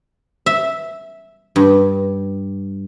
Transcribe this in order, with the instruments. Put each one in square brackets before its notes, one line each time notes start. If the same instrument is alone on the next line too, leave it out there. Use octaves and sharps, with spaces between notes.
[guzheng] E5
G2